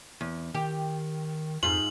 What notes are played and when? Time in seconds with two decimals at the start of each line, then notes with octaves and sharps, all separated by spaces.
0.21 E2
0.54 D#3 G4
1.63 F2 G#2 F4 F#7